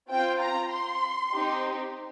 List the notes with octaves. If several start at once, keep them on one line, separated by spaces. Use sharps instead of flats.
C4 F4 G5
A#5
C6
C4 D#4 G4